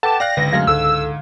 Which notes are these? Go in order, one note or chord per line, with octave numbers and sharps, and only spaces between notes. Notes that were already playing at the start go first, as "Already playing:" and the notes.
A4 B4 F#5 G5 A5 D6
D5 F5 G5 F#6 A#6
G#1 C#2 D3 B4
F#2 F#3 G#3 A3 F5 G#6
C#2 G#2 A4 E6